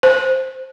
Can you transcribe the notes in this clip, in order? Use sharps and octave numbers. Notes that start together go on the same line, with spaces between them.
C5